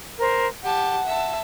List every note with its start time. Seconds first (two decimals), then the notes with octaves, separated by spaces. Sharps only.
0.20 A#4 C5
0.64 G4 F#5 A5
1.06 E5 A5